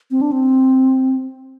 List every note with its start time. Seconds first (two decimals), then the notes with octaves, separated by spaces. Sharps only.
0.11 C4
0.21 D4
0.32 C4